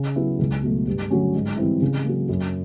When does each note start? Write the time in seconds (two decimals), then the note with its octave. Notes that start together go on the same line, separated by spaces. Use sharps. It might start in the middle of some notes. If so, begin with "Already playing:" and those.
Already playing: C#3
0.16 F#3 B3 E4
0.39 C#2
0.63 B2 F#3 A3
0.87 G2
1.10 D3 F#3 A3 C#4
1.35 G#2
1.57 E3 G3 C4 E4
1.82 C#3
2.05 F#3 A#3
2.29 F#2